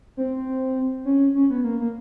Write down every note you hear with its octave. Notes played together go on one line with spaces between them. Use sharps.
C4
C#4
C#4
B3
A#3
A#3